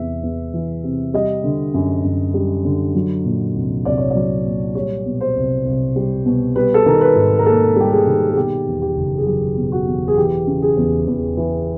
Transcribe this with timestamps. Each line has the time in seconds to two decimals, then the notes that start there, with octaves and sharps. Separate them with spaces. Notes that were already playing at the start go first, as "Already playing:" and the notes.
Already playing: E2 C3 E3 E5
0.23 E2
0.54 E3
0.84 C3
1.14 G3 D#5
1.44 D3
1.74 F#2
2.04 F#2
2.34 G3
2.65 D3
2.95 F#3
3.25 A#2
3.55 C2
3.85 C2 D5
3.98 C#5
4.10 F#3 D5
4.45 A#2
4.75 G3 C#5
5.05 B2
5.21 C5
5.36 C2
5.65 C2
5.96 G3
6.26 B2
6.56 G3 B4
6.74 A4
6.86 D#3 A#4
7.01 B4
7.16 G#2
7.39 A#4
7.46 A#3 A4
7.76 G3 G4
7.91 G#4
8.07 D#3
8.30 G#4
8.36 B2 G4
8.67 E2
8.82 G4
8.96 F#1
9.18 G#4
9.27 F#3 G4
9.57 B2
9.72 F#4
9.87 E2
10.08 G#4
10.17 E3 G4
10.47 C#3
10.62 G#4
10.77 E2
11.07 E2
11.37 E3